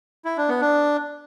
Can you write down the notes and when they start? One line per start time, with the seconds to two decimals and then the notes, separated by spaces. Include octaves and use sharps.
0.25 E4
0.37 D4
0.49 B3
0.61 D4